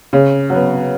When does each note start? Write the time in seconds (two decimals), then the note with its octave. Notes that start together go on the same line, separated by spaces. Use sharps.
0.13 C#3
0.50 F#3 B3